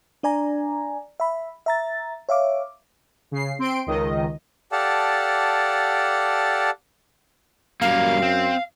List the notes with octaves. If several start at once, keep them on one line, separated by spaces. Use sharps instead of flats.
D4 D5 G#5 A#5
E5 B5
E5 A#5 A6
C#5 E5 F5 D6
C#3 C7
C4 C6 D7
C#2 D#3 D#5
G4 A4 D5 F5 F#5 A5
F#2 G3 A#3 F5
C4